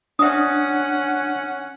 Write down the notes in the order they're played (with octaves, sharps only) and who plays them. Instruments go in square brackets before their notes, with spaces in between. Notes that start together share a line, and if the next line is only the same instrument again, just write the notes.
[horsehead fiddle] C#4 F#5 [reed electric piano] D4 [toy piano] E5 D#6